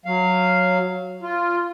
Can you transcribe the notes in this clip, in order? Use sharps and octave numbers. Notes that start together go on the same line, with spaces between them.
F#3 F5
F4